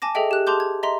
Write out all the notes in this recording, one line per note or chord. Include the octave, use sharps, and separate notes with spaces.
G#5 A5 D6 A#6
G#4 A4 D#5 E5 G5
G4 F#6
G#4 A5 C6 D6 G6
G#6
D#5 E5 A#5 C6